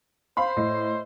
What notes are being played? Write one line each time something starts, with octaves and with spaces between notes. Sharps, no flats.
C5 F5 B5 C6
A2 D#5 C7